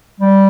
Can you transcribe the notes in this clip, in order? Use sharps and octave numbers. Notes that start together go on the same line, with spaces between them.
G3